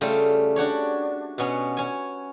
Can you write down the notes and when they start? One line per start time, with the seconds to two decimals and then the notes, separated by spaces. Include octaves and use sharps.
0.01 C#3 G3 A3 F4 G4
0.56 D4 F#4 G4 C#5
1.38 B2 B3 C#4
1.77 C#4 G#5